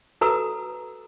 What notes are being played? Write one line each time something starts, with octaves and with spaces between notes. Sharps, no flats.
F#4 A4 B4 A#5 E6